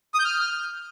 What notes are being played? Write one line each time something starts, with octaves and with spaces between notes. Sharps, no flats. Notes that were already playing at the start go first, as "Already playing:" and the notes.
D#6
G6
F6